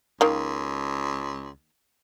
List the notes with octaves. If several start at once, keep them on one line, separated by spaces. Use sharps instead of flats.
C#2 D#3 A#3